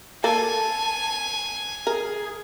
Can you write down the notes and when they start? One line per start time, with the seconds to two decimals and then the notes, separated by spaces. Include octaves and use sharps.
0.24 A#3 A4 G#5 A5
1.87 G#4 A#4